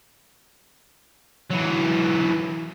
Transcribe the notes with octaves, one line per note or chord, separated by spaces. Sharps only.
E3 F#3